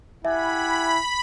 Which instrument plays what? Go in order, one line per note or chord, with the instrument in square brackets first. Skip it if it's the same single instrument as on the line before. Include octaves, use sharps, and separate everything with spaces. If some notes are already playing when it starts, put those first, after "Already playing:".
[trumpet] E4 [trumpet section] G4 F#5 G#5 [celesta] E5 [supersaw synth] B5